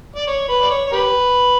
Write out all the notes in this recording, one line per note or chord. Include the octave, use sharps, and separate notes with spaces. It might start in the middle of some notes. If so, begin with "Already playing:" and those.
D5
C#5
B4
D5
C#5
C#5
G4 B4